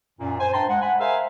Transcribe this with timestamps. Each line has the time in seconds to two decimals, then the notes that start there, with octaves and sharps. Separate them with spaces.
0.19 F#2 A#2
0.40 C5 G#5
0.53 G2 G5 A5 A#5 C6
0.69 G#3 F#5
0.81 F#5 G#5 B5
1.00 G#4 A#4 C5 E5 F5 G#5